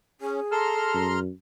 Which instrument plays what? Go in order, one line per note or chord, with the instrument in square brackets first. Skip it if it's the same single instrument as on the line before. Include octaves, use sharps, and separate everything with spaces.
[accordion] C#4 [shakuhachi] G#4
[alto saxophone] A4 [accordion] A#5 C6 F6
[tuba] F#2